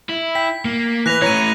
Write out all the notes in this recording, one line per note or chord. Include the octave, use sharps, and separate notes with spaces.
E4
G5 B6
A#3
E3 B4 F#6 A#6 F7
E3 A3 C#5 A#5 A#6 D#7